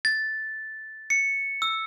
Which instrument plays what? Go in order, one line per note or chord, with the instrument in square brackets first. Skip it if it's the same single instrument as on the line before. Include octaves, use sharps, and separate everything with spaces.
[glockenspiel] A6
C#7
E6